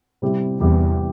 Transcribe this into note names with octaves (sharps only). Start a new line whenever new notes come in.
C3 G3 C4 E4 G4
E2 C3 G3 C4 E4 G4